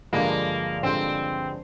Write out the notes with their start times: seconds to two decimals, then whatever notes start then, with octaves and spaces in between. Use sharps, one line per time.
0.13 G2 D3 F3 G#3 A#3 D4
0.82 G2 D3 F3 G#3 C4 D4